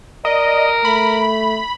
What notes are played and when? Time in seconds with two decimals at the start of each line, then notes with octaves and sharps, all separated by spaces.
0.25 A#4 D5 D#5
0.85 A3 B5